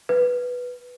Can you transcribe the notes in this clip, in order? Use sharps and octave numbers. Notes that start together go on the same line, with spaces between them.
B4